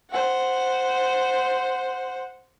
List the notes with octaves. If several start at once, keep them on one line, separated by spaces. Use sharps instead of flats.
C5 F#5